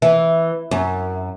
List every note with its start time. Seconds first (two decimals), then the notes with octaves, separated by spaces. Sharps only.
0.02 E3
0.71 F#2